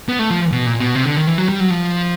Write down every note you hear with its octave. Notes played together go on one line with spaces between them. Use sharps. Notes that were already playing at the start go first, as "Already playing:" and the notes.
B3
A3
F3
B2
A#2
B2
C3
D3
D#3
E3
F#3
G3
F#3
F3